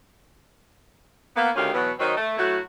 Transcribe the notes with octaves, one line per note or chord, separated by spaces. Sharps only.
A#3 B3
D2 D#3 C#4 G4 F5
B2 E3 F#3 B3
D#3 F#3 C4 D#4
A3
F#3 A3 E4 F#4